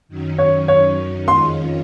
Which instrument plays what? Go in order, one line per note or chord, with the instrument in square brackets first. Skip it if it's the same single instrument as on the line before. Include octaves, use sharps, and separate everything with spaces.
[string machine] F#2 D#3 F#3 C#4
[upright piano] C#5
C#5
[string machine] F2 D#3 G#3 C#4 F4 [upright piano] C6